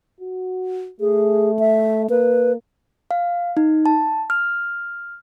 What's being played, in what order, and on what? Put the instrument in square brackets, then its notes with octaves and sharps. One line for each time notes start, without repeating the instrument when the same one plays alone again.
[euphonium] F#4
[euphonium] A3 [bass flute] G#4
[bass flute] E5
[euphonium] A#3 [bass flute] B4
[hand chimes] F5
D#4
A5
F6